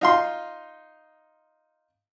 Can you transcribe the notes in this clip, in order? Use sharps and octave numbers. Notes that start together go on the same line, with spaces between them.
D#4 F4 C6